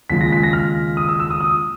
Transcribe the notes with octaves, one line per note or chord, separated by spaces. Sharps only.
D#2 C#3 F3 G#3 B6
A#6
B6
A#6
F6
D#6
E6
E6
D#6
D#6